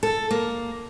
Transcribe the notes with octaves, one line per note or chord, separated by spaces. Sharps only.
A4
A#3